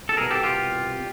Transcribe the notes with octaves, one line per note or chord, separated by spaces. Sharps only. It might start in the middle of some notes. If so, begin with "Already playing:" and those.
A4
C2 B2 G#4 A#4
G4 A4
F4 G4